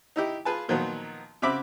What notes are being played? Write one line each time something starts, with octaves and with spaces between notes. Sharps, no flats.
D#4 E4 G4
F4 G#4 B4 G#5 A5
A#2 D#3 F3 F#3 A#3 B3
C#3 C4 F#4 E5 B5 D6